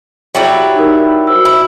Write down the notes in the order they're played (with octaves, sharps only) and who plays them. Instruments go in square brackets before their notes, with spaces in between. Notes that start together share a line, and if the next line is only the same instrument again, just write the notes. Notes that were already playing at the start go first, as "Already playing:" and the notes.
[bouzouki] F#3 G3 E4
[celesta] D#4 A#4
F#4 C5 E6
[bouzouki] E4